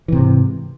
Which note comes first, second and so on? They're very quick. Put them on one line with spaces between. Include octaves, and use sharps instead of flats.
E3 C3 G#2